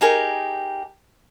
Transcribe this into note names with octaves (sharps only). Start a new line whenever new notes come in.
D#4 G4 G#4 A#4